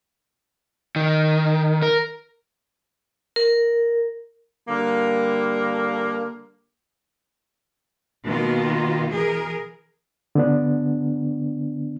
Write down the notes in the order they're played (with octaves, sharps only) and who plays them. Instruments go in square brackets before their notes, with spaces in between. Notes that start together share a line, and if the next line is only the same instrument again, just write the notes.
[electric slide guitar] D#3
A#4
[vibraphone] A#4
[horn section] D3 G3 A#3
[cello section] B2 D#3 A#3 F4
E3 G#4 A#4
[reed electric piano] D3 B3 D4